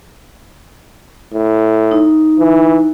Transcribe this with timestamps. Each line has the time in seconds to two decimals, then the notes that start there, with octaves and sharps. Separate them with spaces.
1.33 A2
1.91 D#4
2.38 E3